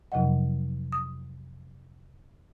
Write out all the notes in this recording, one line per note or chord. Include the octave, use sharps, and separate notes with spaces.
F2 C3 F3 F#3 D#5 F#5
D#6